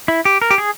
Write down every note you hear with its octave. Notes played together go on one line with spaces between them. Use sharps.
E4
G4
A#4
G4
G#4